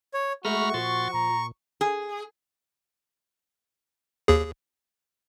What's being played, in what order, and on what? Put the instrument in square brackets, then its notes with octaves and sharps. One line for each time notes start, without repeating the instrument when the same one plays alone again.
[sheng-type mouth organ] C#5
[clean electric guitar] G#3 A3 [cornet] F#4 [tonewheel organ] A#5 B5 F6 [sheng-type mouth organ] C#6
[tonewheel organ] A#2 C6 A6 [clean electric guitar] F3
[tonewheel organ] A#2 [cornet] A#5
[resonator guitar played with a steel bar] G#4
[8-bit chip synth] D#2 G#4